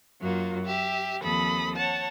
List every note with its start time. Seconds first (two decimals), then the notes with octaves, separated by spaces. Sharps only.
0.20 F#2 F#3 A#3 F4
0.65 G4 E5
1.21 D#2 F3 C4 A4 B5 D#6
1.76 C#5 F#5 A5